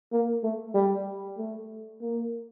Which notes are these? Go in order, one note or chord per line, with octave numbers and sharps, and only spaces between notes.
A#3
A3
G3
A3
A#3